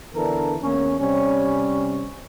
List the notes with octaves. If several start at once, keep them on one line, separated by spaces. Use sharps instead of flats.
D3 E3 B3 D4 A4 A#4
E2 A#3 C#4
C3 G3 C#4